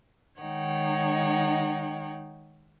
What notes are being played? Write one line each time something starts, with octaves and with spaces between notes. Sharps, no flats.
D#3 G#3 D#4 C#5 F#5 G5